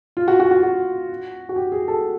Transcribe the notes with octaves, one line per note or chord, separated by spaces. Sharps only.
F4
F#4
F#4
F#4
F#4
F#4
G4
G#4
A4